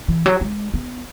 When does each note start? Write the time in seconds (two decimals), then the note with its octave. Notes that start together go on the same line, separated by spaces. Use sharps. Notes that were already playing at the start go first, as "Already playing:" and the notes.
0.08 E3
0.26 F#3
0.41 G#3
0.74 B3